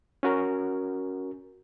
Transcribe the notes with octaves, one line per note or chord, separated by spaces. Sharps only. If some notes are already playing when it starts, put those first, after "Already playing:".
C#4 F#4 A#4